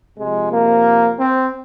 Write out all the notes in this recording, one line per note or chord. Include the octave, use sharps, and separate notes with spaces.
C3 F3 G#3
A#3
C4